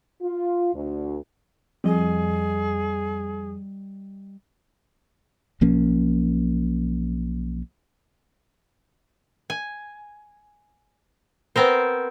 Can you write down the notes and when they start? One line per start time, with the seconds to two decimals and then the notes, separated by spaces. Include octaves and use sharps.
0.22 F4
0.74 D2
1.84 F2 G3 G#4 D#5
5.61 B1 F3 A#3 C#4
9.50 G#5
11.56 B3 C4 A#4 C5